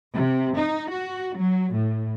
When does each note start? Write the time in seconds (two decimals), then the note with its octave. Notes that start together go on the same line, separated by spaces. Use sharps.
0.15 C3
0.58 D#4
0.91 F#4
1.38 F#3
1.74 A2